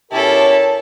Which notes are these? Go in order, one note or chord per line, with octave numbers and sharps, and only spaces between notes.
B2 C#4 E4 G4 A4 A#4 C#5 A5